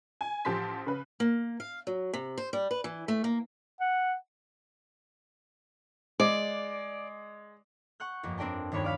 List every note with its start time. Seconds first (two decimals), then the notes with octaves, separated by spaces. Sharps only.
0.21 G#5
0.45 A1 F3 G4 A5 C6 B6
0.86 C#3 B4
1.20 A#3
1.60 F5
1.87 F#3
2.13 C3
2.38 C5
2.53 G3
2.71 B4
2.84 E3
3.08 A3
3.24 A#3
3.80 F#5
6.20 G#3 D5
8.00 F#5 C#6 F#6 G6
8.23 G1 F2 A#3
8.38 C4 D4 A#4 D5 G5 A5
8.72 G1 D#2 D4 C#5 B5 G#6
8.84 D5 F5 B5